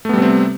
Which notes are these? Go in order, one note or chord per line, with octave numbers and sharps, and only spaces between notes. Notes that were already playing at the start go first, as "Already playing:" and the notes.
C3 G3 A3 B3 C4